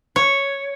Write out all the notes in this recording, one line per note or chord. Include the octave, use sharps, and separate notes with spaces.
C#5